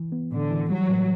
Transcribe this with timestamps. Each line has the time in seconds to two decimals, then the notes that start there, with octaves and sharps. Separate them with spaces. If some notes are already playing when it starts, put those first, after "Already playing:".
Already playing: E3
0.12 B3
0.32 A2 D3
0.51 E3
0.70 F#3 G3
0.89 A2